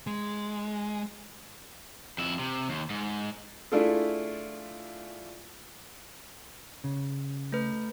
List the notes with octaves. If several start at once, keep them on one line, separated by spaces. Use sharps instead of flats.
G#3
F2 E4
C3
D#2
G#2
A3 D4 E4 F4 G#4 A4
C#3
A3 B4